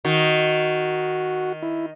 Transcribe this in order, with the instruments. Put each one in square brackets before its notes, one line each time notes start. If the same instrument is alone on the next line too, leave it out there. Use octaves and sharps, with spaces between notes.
[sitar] D#3 [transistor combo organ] F#4
[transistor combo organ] E4